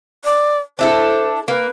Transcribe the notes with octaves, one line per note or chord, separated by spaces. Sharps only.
D5
D4 E4 A4 C5
A#3 B4